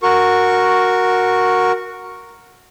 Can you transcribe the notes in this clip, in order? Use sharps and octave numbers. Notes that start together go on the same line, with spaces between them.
F#4 A#4 C#6